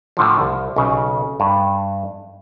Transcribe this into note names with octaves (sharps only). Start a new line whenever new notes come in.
A2 D3 F3
C2
B1 C#3
G2